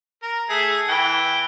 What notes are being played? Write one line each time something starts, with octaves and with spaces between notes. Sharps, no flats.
A#4
A3 G#4
E3 G5